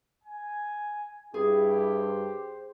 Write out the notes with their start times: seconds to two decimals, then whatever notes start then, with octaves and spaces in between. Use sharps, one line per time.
0.24 G#5
1.34 G2 E4 G4 G#4
1.97 C5